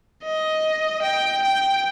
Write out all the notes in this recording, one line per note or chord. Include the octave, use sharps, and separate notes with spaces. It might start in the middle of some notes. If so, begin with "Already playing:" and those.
D#5
G5
G5